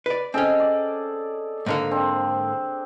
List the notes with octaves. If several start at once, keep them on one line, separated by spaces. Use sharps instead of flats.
B4 D5
C4 C#4 G#4 A4 D#5
D5
G#2 D3 A#3
C4 D4